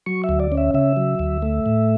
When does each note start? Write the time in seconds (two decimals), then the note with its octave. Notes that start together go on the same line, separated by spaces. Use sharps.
0.06 F#3 C#6
0.24 E5
0.29 D2
0.40 D5
0.52 C#4
0.57 E5
0.74 C#3 E5
0.97 F#3
1.19 D2
1.42 A3
1.66 A2